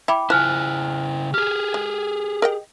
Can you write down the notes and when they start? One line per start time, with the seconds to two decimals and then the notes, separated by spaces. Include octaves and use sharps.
0.08 E4 G5 B5 D6
0.30 C#3 F3 E4 G#5 F6 F#6
1.34 G4 G#4 F6
1.74 G#3
2.42 A#4 D#5 G5